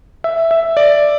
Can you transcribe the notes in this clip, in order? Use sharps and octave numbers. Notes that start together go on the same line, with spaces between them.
E5
E5
D5